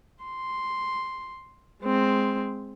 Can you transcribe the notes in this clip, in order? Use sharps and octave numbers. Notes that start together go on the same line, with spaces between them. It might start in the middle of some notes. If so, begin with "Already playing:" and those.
C6
G#3 C4